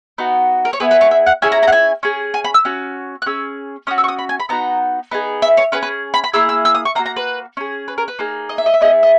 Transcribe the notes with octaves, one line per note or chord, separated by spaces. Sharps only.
B3 D#4 F#4
A#4
C#5
B3 E4 G#4 B4
B4
C#5
E5
F#5
C#4 E4 G#4 G#5
A#5
A#5
F#5
G#5
C#4 G#4
G#5
B5
E6
C#4 F#4
F#6
C#4 G#4 E6
C#4 F#4 D#6
E6
C#6
D#6
B5
G#5
B5
B3 D#4 F#4 A#5
B3 D#4 G#4
E5
C#5
C#4 G#4 B4
B4
B5
B5
A#3 E4 G#4 E6
E6
E6
D#6
C#6
A#3 D#4 F#4 A#5
A#5
B4
C#4 G#4
B4
A#4
B4
A#3 D#4 G#4
D#5
E5
D#5
E5
B3 E4 G#4 D#5
D#5